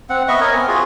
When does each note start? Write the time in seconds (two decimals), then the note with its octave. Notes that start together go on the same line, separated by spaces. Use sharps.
0.10 C4 F#5
0.28 B3 D#5 E5 C#6
0.41 A#4 C#5 D#5
0.54 B3 C4 G#5
0.68 F4 F#4 G#4